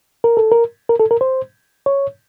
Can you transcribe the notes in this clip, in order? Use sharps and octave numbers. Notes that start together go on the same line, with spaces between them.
A#4
A4
A#4
A#4
A4
A#4
C5
C#5